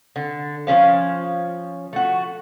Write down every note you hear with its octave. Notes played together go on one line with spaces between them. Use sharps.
D3
F3 G3 C#4 F5
A3 F#4